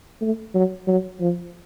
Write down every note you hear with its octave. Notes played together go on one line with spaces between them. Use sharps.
A3
F#3
F#3
F3